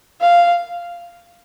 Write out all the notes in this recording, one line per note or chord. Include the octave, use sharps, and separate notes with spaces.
F5